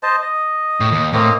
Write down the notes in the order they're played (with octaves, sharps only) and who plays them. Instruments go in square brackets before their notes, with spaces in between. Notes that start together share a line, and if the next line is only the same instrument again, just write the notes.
[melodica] C5 D#5 A5
D#5
[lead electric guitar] A2
D#2
[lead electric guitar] A2 [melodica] A#3 C4 D#5